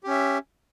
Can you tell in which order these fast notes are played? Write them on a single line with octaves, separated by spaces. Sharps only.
G4 C#4 E5